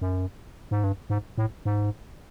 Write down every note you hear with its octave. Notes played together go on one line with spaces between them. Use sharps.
F#2
G#2
G2
G#2
A2
G#2